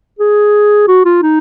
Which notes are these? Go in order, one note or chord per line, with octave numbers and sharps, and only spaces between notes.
G#4
F#4
F4
D#4